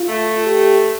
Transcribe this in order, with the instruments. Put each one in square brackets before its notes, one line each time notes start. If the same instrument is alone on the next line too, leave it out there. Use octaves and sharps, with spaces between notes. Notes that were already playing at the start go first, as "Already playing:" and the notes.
Already playing: [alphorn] F4
[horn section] A3
[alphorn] G4